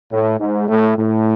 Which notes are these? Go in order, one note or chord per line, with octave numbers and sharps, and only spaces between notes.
A2
G#2
A2
A2